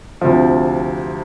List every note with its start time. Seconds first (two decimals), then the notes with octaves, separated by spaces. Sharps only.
0.21 D2 C3 F3